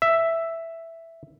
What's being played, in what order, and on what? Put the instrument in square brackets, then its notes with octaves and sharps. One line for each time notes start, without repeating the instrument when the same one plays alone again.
[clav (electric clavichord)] E5